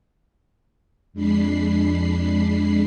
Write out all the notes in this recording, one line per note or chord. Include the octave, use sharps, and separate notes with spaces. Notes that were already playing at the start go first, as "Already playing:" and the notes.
F2 G#3 D4 B5 C7